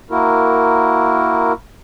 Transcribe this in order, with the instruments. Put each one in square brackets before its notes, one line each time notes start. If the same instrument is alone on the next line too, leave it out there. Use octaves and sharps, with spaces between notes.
[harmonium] A#3 E4 F#4 A#4